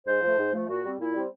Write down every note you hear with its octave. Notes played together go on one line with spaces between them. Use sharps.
G#2 C5
F3 A3
G#2
F3 A3
A#2 F#4
G3 C4
A#2 E4
G3 C4